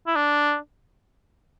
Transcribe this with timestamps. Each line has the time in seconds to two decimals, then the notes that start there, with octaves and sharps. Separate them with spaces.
0.07 E4
0.16 D4